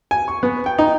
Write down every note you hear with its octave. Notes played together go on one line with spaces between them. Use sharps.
G#5
C#6
B3
G5
D#4